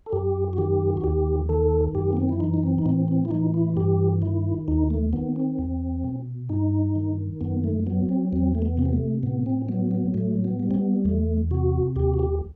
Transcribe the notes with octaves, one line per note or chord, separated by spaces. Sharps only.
A4
F#2 G4
F#4
D#3 G4
F#4
D#2 G4
D#3 A4
F#2 G4
B3
C4
E4
E3 D#4
D#4
C4
D#4
A2 C4
C4
E4
E3 D#4
E4
G2 G4
D#3 E4
D#2 D#4
A3
D#3 B3
C4
E2
B2
G2 D#4
D#3
F#2 B3
A3
F#3 B3
C4
E2 C4
A3
B3
C3 C4
B3
A3
A2 B3
C4
F#3 B3
B3
A2 A3
B3
G3
C4
B3
E2 A3
C3 F#4
D#2 G4
F#4
G4